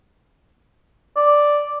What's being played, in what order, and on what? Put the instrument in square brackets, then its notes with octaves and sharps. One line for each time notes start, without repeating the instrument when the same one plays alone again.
[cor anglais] D5